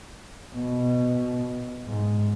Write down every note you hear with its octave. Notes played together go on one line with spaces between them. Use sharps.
B2
G#2